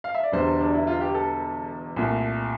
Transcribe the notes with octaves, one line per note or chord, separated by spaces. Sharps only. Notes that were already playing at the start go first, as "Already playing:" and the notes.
F5
E5
D5
E1 E2 D3 G3 C5
D4
E4
F4
G4
A4
C2 A#2 A3